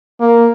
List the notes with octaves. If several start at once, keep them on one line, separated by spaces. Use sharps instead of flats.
A#3